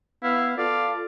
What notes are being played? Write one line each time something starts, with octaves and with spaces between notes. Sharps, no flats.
B3 E4 F5
F4 A4 D5 F5